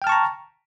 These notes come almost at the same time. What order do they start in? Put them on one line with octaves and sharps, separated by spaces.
G5 F6 A5 C#6 A#5